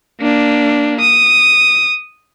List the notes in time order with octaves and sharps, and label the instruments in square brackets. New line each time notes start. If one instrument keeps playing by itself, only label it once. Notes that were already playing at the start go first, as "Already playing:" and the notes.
[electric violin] A#3 D4
D#6